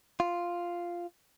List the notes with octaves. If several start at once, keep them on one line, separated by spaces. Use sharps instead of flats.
F4